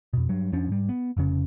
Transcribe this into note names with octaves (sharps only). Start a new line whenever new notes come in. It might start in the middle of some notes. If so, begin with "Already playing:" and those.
F2 B2
G2 F#3
F2 F3 C#4 D4
G#2 G3
B3
F1 F2 C#3 C#4